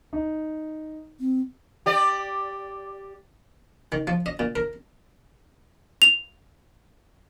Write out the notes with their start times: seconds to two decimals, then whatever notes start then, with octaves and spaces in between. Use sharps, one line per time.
0.13 D#4
1.20 C4
1.86 G4 D5
3.92 D#3
4.07 F3
4.26 D#5
4.39 A#2
4.56 A#4
6.02 F7